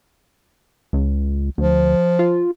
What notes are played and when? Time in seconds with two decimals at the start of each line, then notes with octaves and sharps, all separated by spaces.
0.93 C#2
1.58 D2 F3
2.19 F4